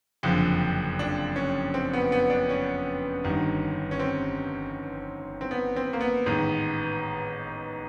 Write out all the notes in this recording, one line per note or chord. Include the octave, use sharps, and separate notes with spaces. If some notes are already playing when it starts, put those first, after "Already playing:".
F#1 F2 D3 F3
D4
C#4
C4
B3
B3
D4
C#4
G1 G2 D#3
C#4
C4
C4
B3
C4
A#3
B3
A1 G#2 D#3